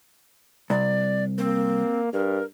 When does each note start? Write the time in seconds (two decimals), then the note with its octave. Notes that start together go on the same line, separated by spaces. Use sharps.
0.70 C2 D5
1.38 A#3 C4
2.13 G2 A#4